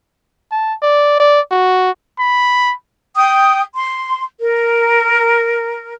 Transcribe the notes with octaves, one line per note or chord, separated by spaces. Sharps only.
A5
D5
D5
F#4
B5
G5 D#6
C6
A#4